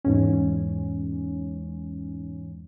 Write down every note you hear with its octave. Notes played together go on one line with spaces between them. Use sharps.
E2 G#2 C#4